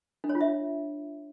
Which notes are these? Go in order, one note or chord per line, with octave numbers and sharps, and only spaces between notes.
D4
C#5
F4
E5